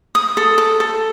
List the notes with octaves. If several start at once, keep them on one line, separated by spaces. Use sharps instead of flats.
D#6
A4
A4
A4